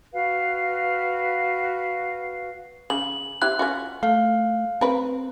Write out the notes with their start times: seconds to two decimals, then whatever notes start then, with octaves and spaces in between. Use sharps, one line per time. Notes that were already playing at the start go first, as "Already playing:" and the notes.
0.14 F#4 B4 F5
2.90 C#3 F#7
3.42 C4 E4 G4 F#6
3.59 C#4 F4 F#4
4.03 A3 F5
4.81 C4 A#4 B4